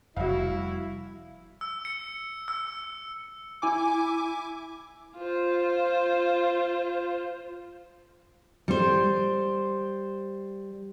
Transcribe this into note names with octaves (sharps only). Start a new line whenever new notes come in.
F1 G3 E4 F#4 F5
E6
C#7
E6
E4 G#5 D6
F4 C5
G3 C5